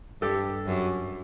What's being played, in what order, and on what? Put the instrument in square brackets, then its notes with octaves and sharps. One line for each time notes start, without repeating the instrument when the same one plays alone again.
[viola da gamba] G2 [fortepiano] G4 A4
[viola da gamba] F#2